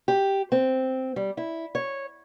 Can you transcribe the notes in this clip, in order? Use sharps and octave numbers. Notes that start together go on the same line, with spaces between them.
G4
C4
G3
E4
C#5